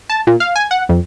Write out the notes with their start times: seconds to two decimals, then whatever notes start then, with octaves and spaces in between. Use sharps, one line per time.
0.10 A5
0.27 A#2
0.40 F5
0.56 G#5
0.71 F#5
0.89 F2